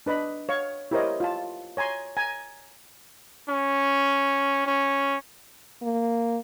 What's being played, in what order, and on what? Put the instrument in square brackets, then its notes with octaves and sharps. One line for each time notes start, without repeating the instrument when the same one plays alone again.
[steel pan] D4 B4 D#5 B5
C#5 F5 C#6
E4 G4 A#4 C5 C#5 D#5
F4 A5
C#5 G#5 A#5 C6
G#5 A#5
[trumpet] C#4
C#4
[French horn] A#3